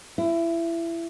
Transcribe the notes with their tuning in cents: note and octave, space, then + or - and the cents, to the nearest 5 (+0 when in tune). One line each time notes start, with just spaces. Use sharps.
E4 +25